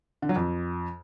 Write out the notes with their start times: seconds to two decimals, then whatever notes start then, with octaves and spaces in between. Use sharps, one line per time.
0.22 D3
0.29 F#3
0.36 F2